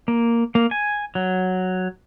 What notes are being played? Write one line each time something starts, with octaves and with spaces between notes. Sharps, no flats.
A#3
A#3
G#5
F#3